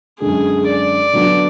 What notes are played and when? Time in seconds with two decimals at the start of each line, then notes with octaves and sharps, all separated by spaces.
0.20 F#2 D3 G#3 G#4
0.66 D5
1.13 D3 F#3 B3 D4